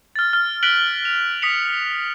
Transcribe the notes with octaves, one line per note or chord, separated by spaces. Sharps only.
F6 A6
F6
F#6 B6 D7 F#7 G7
F7
D#6 B6 C#7 F7